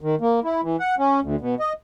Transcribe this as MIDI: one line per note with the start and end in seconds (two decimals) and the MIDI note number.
0.01 0.15 51
0.21 0.40 58
0.44 0.61 64
0.63 0.76 52
0.79 0.95 78
0.98 1.20 61
1.23 1.36 38
1.41 1.55 47
1.59 1.73 75